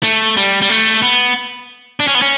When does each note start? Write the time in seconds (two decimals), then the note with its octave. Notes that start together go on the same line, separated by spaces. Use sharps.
0.03 A3
0.37 G3
0.62 G3
0.69 A3
1.02 B3
2.00 D4
2.07 C#4
2.15 B3
2.22 C#4